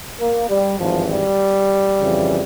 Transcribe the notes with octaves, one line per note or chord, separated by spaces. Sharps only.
A#3
G3
G#1 G2 E3 F3
G3
F2 C#3 E3